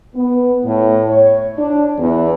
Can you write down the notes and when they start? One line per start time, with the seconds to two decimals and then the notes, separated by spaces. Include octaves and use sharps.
0.15 B3
0.64 A2
1.08 C#5
1.58 D4
1.99 E2